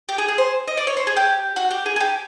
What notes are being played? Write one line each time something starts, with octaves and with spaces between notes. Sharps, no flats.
G4
G#4
G#4
C5
D#5
D5
C#5
C5
G#4
G4
F#4
G4
G#4
G#4
G4